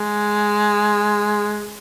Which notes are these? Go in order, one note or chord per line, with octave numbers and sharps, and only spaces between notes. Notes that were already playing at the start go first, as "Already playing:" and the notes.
Already playing: G#3